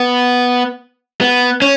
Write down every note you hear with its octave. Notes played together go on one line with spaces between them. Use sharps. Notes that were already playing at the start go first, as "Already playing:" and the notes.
Already playing: B3
B3
C#4